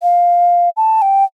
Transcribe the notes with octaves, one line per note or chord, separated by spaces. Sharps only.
F5
A5
G5